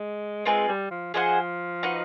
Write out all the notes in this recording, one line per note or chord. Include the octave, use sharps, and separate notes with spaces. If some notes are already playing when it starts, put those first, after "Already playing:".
Already playing: G#3
G#3 C4 F4 G#4 B4
G3
F3
F3 G#4 C5 D#5 F#5
D#4 F#4 B4 D#5